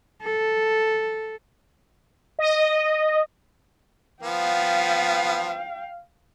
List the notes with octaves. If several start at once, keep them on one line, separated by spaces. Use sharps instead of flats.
A4
D#5
F3 B3 F5 G5